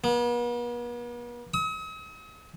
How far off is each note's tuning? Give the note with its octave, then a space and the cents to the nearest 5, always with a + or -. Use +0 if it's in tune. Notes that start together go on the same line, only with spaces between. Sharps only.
B3 -45
D#6 +45